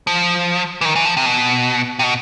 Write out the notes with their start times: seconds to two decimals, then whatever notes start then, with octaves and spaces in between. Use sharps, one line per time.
0.07 F3
0.81 E3
0.85 D#3
0.96 E3
1.05 F3
1.17 C3
1.26 B2
1.99 C3
2.03 B2